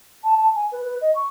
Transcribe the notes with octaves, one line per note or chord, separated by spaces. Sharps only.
A5
A5
G#5
B4
B4
D#5
C#6